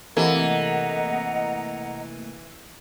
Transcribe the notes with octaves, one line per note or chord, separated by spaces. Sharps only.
C3 E3 A3 A#3 D#5 F#5 A#5